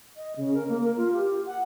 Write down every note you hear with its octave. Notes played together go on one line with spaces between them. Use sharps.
D#5
C#3
A#4
A#3
A#4
F4
G4
F#5